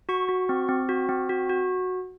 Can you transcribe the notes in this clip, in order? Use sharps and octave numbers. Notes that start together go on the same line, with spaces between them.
F#4 C#6
F#4
C4
C4
F#4
C4
F#4
F#4